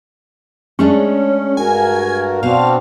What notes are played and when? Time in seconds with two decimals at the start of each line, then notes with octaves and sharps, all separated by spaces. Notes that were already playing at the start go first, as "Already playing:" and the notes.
0.79 G#3 A3 C#4 D4
1.57 G2 F#4 A#4 G#5
2.43 B2 C4 D4 F#4 F5